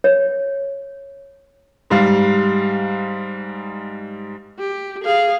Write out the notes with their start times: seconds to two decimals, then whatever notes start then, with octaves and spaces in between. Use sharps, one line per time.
0.04 C#5
1.90 G#2 G3 F5
4.59 G4
5.04 G#4 F5